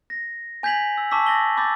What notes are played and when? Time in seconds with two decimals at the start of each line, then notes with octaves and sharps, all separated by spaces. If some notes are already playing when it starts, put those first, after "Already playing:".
0.10 A#6
0.63 G#5 G6 G#6 B6 F7 F#7
0.98 E6
1.11 A5 C#6 D6 E6 B6
1.26 D6 A6 A#6 D#7 F#7 G7
1.57 B5 D6 E6 G6 A6 B6